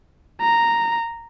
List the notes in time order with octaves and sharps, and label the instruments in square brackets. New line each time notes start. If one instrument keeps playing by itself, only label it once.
[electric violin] A#5